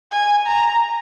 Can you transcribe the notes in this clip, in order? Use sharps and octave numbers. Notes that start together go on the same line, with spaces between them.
G#5
A#5